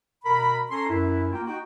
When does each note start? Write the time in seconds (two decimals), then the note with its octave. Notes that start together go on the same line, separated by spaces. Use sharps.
0.24 B2 A#4 A#5 B5
0.71 C#4 A4 A#5 C6
0.90 F#2 E4
1.32 A#3 F4 G5
1.47 D#4 F#4 G5